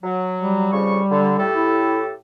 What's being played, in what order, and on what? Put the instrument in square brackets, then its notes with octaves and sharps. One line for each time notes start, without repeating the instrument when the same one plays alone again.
[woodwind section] F#3
[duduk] G3
[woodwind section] F2 C#3 C#6
D3
A2 G4 A4
[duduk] E4